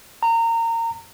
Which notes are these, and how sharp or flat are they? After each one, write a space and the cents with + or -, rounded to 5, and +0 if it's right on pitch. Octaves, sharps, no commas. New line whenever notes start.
A#5 -25